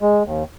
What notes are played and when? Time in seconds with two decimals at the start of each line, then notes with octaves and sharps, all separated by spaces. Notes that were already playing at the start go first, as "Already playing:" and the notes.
0.02 G#3
0.24 D#2